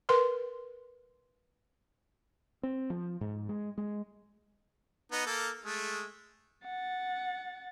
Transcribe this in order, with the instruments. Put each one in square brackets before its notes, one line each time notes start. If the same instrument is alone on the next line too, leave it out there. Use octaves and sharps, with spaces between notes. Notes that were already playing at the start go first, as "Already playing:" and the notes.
[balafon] A#4 B4 C6
[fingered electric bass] C4
F3
G#2
G#3
G#3
[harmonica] B3 D#4
A#3 A4 A#4
G#3 A3
[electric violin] F#5 A6